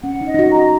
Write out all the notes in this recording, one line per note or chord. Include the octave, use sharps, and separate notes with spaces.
C#4 F#5
D#4
D#5
D#4
F#4
A#5
F#4